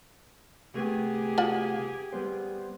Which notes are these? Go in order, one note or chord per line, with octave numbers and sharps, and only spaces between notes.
C2 A3 B3 G4 G#4
F4 F#4 F#5
G3 B3 C5